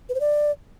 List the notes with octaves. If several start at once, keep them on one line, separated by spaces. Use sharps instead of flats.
B4
C5
D5